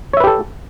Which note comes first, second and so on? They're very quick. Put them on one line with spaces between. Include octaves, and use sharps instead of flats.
C#5 E5 B4 G4 A4